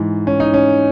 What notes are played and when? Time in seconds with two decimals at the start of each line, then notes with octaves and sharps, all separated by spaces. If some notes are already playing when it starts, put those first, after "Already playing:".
Already playing: G#2 E3
0.27 C#4
0.40 D#4
0.54 C#4